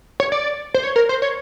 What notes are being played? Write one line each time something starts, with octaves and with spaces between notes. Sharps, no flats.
C#5
D5
C5
C#5
A#4
C5
C#5